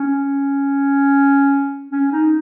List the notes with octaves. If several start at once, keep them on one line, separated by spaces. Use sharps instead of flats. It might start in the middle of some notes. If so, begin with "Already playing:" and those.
Already playing: C#4
C#4
D#4